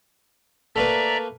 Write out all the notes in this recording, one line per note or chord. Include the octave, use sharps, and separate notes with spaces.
A3 A#3 B4 D5 E5 A#5